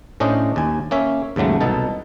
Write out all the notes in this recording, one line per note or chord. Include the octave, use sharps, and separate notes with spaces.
A2 C#4 D4 C5 D#5
D#2 G#5
A#3 C#4 C#5 E5
D#2 G#2 C#3 F#3 A3
C2 B2 D#4 A4